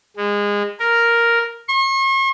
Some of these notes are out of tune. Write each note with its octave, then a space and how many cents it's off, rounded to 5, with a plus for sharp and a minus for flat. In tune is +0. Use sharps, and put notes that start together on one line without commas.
G#3 -25
A#4 +0
C#6 -45